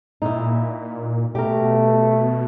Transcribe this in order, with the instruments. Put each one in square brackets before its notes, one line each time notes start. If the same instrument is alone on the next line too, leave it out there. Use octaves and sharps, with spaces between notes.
[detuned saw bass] A#2 [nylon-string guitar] D#4 E4
[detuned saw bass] B2 [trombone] A3 [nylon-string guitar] G4 A#4